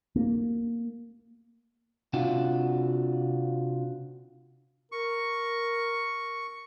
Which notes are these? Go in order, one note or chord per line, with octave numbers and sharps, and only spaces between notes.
A#3
C3 D4 F4 F#4
A#4 C#6